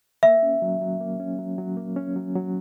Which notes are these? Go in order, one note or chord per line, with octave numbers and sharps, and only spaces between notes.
A#3 E5
C#4
F#3
F#3
A#3
C#4
F#3
F#3
A#3
C#4
F#3
F#3